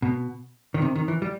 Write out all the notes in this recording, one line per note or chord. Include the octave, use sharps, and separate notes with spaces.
B2
D#3
C3
D#3
E3
G3